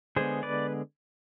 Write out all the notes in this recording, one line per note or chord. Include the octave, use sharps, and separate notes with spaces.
D3 G#3 B3 G#4 C5
B4 D5